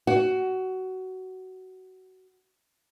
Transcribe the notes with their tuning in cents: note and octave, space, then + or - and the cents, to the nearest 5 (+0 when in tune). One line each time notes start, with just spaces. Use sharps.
F#4 +15